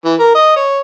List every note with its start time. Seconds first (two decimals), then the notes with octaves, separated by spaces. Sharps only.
0.05 E3
0.19 A#4
0.35 D#5
0.56 C#5